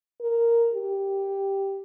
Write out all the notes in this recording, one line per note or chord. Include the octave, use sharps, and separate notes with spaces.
A#4
G4